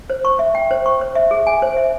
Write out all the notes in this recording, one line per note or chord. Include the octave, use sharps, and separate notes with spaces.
C5
C#6
E5
G5
C5
C#6
C5
E5
G#4
G#5
C5
E5